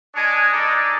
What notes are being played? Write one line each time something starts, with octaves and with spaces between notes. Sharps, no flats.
G#3 D4 C#5 G#5 D#6
G#3 D#4 A4 D5